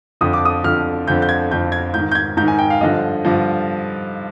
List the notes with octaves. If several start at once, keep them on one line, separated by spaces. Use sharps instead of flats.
F2 D3 F3 D#6
D6
D#6
F2 D3 F3 F6
F2 D3 F3 G6
G6
G#6
F2 D3 F3 G6
G#6
G#2 D#3 G6
G6
G#6
G#2 D#3 G6
G#5
G5
F5
G2 D3 F3 D#5
G2 D3 F3